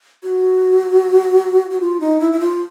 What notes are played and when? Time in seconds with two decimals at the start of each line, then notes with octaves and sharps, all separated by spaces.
0.23 F#4
1.70 F#4
1.81 F4
2.00 D#4
2.20 E4
2.32 E4
2.40 F4